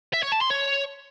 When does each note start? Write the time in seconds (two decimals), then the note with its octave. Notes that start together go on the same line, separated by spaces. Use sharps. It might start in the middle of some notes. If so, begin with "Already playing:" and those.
0.14 E5
0.23 C#5
0.32 A5
0.41 C6
0.51 C#5